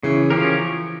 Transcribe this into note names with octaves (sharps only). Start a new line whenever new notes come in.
C#3 E3
F3 C#4 G4 A#4